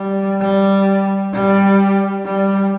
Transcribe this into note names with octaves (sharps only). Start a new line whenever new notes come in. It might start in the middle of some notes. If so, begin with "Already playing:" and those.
Already playing: G3
G3
G3
G3